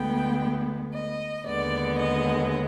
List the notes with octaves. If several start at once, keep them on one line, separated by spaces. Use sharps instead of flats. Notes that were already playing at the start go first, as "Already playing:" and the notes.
Already playing: D2 D3 G#3 B3 G5
D#5
D#2 D3 G#3 B3 D5
D#5